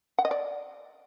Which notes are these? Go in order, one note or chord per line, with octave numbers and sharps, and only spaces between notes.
F#5
D#5
D5